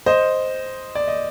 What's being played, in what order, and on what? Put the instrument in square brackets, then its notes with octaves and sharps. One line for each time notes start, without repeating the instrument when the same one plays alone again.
[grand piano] C5 D#5
D5
D#5